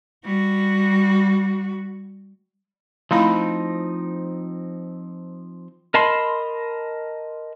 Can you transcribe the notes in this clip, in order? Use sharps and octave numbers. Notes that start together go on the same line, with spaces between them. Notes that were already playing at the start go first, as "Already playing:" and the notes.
G3 F#4
F3 A3 C4 D#4 E4 B5
A#4 D#5 A5 B5 C6